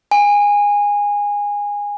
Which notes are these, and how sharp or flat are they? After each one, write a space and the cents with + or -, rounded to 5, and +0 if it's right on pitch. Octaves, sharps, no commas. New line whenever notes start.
G#5 -20